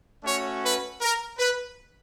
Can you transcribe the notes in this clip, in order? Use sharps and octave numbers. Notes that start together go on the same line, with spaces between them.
A3 C#4 F#4 C#5
B4
A#4
B4